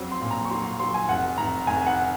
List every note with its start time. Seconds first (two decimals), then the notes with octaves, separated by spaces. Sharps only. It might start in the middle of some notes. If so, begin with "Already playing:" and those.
Already playing: F2 F#3 C4
0.11 C6
0.21 A#2
0.31 A#5
0.45 C#6
0.50 F#3 C6
0.65 C6
0.79 F#3 C6
0.94 G#5
1.09 F1 F#5
1.38 F1 A#5
1.67 F1 G#5
1.86 F#5